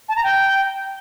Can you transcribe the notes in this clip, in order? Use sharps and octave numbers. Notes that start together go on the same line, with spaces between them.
A5
A#5
G5